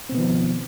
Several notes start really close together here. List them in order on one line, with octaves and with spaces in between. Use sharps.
C4 B2 B3 D#3 F3